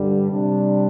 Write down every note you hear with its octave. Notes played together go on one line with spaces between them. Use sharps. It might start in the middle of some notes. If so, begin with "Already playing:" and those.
Already playing: G2 D3 G3
C3 G3 D4